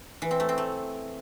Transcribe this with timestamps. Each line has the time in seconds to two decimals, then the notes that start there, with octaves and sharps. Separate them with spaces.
0.22 E3
0.31 C4
0.40 A3
0.49 C4
0.58 A3